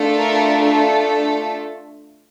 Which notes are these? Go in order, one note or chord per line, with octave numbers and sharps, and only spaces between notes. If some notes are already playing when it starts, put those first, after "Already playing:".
Already playing: A3 D4 F4 A4
A#4
A4